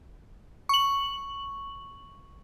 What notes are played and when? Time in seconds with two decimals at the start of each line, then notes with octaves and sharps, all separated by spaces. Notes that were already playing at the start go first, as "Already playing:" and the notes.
0.69 C#6 F#7